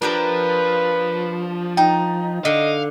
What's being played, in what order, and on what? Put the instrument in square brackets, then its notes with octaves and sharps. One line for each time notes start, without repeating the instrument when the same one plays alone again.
[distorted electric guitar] F3 [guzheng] D4 G4 A#4 [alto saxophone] B4
[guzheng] D#4 [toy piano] G5
[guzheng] D3 [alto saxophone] D#5 [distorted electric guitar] F5